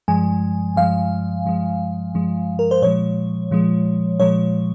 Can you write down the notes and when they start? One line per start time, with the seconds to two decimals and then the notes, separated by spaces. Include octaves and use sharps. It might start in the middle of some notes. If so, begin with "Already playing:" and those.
0.08 G2 F3 G#3 G#5
0.76 G2 F3 G#3 F5
1.46 G2 F3 G#3
2.15 G2 F3 G#3
2.59 A#4
2.71 C5
2.82 A#2 F3 G#3 C#5
3.51 A#2 F3 G#3
4.20 A#2 F3 G#3 C#5